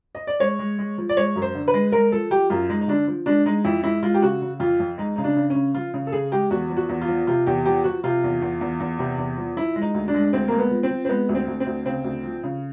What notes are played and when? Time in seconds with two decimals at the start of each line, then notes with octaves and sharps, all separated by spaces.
0.15 D#5
0.27 D5
0.40 G#3 C#5
0.59 G#3
0.79 G#3
0.98 F3
1.09 D5
1.17 G#3 C#5
1.36 F#2
1.42 C5
1.55 D3
1.68 B4
1.74 G#3
1.92 G#3 A#4
2.12 F3 A4
2.31 F3 G4
2.50 F#2 F4
2.69 G#3 D#4
2.81 D#4
2.88 D3 D4
3.08 F3
3.26 G#3 D4
3.46 G#3 D#4
3.65 F2 E4
3.84 G#3 E4
4.03 G#3 F4
4.14 G4
4.22 C#3 F#4
4.42 C#3
4.60 F2 F4
4.80 F2
4.98 G#3 D#4
5.16 C#3 D#4
5.24 D4
5.36 C#3
5.50 C#4
5.55 C#3
5.74 F3 F4
5.94 C#3
6.07 A4
6.12 C#3 G#4
6.32 G#3 G4
6.50 E2 F#4
6.70 F3
6.77 F#4
6.89 E2
7.01 F4
7.08 F3
7.27 C3 F4
7.46 E2 G4
7.65 F3 G4
7.84 F3 F#4
8.04 C3 F4
8.24 E2
8.42 E2
8.61 E2
8.80 E2
8.99 C3
9.18 E2
9.38 F3
9.57 F3 E4
9.76 G#3
9.82 D#4
9.94 D2
10.08 D4
10.14 G#3
10.33 D2 C4
10.48 G#3 A#3
10.59 B3
10.71 F3
10.83 C4
10.91 F3
11.05 C4
11.09 G#3 B3
11.29 D2
11.35 C4
11.48 D2
11.60 C4
11.66 D2
11.85 C#3 C4
12.04 D2
12.24 F3
12.44 C#3